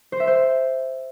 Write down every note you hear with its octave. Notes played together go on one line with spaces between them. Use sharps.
C5
E5
C5